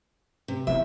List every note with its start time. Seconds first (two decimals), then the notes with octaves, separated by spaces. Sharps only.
0.48 C3
0.67 E2 D#4 E5